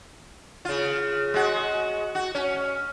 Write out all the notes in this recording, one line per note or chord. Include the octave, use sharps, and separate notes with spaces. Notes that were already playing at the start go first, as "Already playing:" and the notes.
C#3 F4
G#3 F#4
F#4
C#4